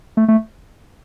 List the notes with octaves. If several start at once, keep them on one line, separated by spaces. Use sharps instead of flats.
A3
A3